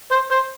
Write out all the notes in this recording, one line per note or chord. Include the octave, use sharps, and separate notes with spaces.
C5
C5